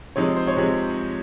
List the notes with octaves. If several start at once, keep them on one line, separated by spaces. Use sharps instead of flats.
C3 F3 G#3 D#4 C#5
C5
C#5
C3 F3 G#3